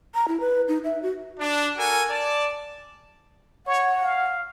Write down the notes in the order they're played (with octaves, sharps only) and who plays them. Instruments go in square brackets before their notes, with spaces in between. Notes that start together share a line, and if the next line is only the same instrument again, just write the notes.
[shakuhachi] A#5
E4
B4
D#4
E5
F#4
[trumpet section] D4
F#4 A4 A#4 G#5
D5 A5
[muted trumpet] C#5 [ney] F#5
[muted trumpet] F5